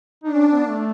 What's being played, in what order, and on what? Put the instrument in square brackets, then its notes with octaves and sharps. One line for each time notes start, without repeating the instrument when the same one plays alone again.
[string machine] D4 [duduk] D#4
[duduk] C#4
C4
B3
A3